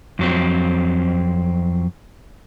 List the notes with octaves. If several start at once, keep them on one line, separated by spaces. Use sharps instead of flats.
F2 F#3 C4